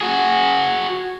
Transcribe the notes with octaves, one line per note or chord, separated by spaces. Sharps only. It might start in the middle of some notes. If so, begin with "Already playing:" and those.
F#4 G#4